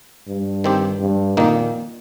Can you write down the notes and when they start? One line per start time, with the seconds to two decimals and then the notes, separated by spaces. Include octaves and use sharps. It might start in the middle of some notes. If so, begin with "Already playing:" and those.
0.28 G2
0.64 D#3 C4 G4
1.00 G2
1.37 F2 A#2 D#3 A#3 D#4